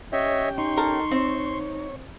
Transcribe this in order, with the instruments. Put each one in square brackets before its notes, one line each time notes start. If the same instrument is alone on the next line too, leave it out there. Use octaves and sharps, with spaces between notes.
[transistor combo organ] C#4 G4 G5 [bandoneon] C#5 D#5 E5
[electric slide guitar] D#4 [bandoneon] C6 C#6
[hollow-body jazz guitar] A4 A#4
[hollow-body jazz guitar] C4 [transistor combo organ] C#5